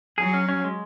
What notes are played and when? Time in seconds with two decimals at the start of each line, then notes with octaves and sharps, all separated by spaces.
0.18 F#3 G#4
0.34 C#4
0.49 C#4
0.64 G#3